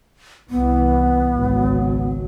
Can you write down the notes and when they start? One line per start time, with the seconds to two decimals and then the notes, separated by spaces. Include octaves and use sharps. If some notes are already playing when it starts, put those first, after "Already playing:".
0.50 C2 E3 B3
1.33 G#1 C#2 F#3